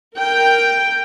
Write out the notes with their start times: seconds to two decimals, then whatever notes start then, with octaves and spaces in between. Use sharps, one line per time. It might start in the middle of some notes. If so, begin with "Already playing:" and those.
0.17 A#4 G5